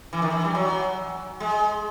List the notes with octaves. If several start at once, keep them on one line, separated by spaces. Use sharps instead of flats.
E3
D#3
E3
G3
F#3
G#3